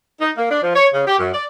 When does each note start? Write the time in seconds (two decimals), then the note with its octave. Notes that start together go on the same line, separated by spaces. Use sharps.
0.20 D#4
0.37 A#3
0.50 D4
0.62 F3
0.75 C#5
0.93 C#3
1.07 G4
1.18 F#2
1.33 D5